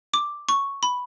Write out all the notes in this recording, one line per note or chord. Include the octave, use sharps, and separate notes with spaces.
D6
C#6
B5